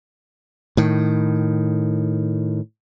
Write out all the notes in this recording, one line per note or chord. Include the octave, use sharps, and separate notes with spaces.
A2 D#3